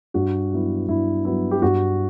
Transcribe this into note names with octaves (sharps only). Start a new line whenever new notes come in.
G2 F#4
F#3 B3 E4
G2 E4
F#3 B3 E4
G4
G2 F#4